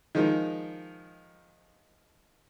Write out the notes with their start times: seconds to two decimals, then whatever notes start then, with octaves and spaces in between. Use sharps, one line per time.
0.15 D#3 F3 G#3 D#4 A#4